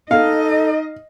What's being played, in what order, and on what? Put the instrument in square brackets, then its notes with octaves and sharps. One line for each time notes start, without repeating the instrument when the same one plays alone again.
[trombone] D#4 [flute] A4 [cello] D#5 [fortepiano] F5